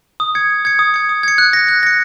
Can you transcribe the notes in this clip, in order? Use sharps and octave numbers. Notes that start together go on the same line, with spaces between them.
D#6
G#6 C#7
D#6
G#6 C#7
D#6
G#6 C#7
D#6
G#6 C#7
F#6
A#6 C#7
F#6
A#6 C#7